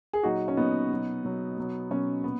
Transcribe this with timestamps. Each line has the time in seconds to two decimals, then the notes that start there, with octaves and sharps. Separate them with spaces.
0.13 G#4
0.23 A#2 F#3 D#4 F#4
0.48 C#4
0.57 A#2 F#3 B3 D#4
0.90 B2 F#3
1.24 B2 F#3
1.57 B2 F#3
1.91 B2 F#3 C#4
2.24 A#2 B3